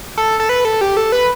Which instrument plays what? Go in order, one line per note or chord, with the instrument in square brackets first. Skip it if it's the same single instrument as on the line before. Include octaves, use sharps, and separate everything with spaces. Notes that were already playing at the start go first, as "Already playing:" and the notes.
[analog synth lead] A4
A4
B4
A4
G4
A4
B4